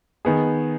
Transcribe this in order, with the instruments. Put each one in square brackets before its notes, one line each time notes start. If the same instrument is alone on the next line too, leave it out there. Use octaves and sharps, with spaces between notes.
[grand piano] D#3 B3 G#4